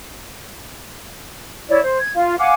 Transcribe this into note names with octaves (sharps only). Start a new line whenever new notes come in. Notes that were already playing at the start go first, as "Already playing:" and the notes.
E4 C#5 D5
C5
G#6
F4 F5
F5 F#5 G#5 D6